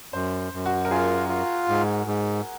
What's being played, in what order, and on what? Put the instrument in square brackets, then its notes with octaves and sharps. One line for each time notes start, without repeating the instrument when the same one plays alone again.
[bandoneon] F#2 [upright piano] C5
[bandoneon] F#2
[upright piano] F#4
A#4
[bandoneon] F4 [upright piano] G#4
[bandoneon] F4
G#2
G#2